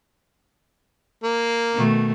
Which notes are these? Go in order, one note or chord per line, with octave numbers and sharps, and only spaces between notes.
A#3
B2 D#3 A3